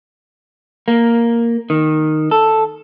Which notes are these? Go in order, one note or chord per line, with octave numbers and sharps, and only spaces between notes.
A#3
D#3
A4